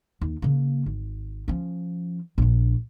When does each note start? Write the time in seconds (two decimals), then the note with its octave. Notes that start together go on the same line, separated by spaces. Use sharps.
0.21 D#2
0.42 C#3 A#3
0.86 G#1
1.48 F3 C#4
2.38 A#1 D4